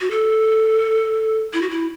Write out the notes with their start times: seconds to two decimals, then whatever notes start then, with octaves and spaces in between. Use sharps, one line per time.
0.01 F#4
0.11 A4
1.53 E4
1.62 F#4
1.70 E4